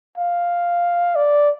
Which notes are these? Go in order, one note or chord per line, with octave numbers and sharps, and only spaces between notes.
F5
D5